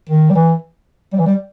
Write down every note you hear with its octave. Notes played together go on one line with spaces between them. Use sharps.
D#3
G3
E3
G3
E3
G3